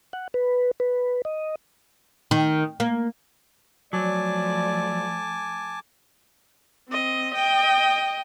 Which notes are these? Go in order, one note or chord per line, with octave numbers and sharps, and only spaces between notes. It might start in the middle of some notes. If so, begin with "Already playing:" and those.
F#5
B4
B4
D#5
D#3
A#3
F3 F#3 A3 D5 G#5 A5 D6
C4 D#5
D#5 G5